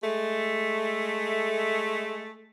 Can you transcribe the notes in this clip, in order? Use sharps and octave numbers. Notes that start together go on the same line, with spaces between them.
G#3 A3